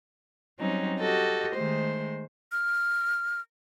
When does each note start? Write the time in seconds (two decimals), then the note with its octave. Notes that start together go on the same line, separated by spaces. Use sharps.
0.59 F#3 G3 C4 C#4 D#4
0.99 F#4 G4 A4 D#5
1.55 D#3 G#3 A3 C5
2.52 F6